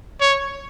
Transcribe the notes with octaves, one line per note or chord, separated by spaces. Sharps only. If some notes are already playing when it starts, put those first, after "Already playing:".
C#5